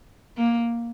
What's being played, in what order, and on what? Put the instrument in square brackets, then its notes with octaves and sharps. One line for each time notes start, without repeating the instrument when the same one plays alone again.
[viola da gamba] A#3